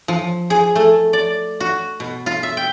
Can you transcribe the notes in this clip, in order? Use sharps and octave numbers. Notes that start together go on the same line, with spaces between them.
F3
G#4
A3
D5
F#4
B2
F4
E5
G5